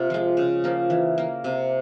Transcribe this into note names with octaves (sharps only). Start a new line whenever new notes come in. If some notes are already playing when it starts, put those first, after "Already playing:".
Already playing: C3 A#3 F4
F3 G#3
C#3
F3 A#3
E3
A#3
C3